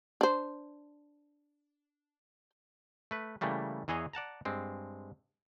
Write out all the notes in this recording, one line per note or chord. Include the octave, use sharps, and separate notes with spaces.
D4 C5
A3 B4
C#3 E3 G3 A3 A#3
E2 E3 G#4 C#5 D#5 F5
D5 F#5 A5 A#5
G2 G#3 C4